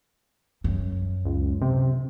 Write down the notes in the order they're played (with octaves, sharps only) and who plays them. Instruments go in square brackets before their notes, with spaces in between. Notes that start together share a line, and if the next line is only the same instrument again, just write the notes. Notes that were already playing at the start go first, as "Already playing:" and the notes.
[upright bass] F#2
[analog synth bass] C#2
C3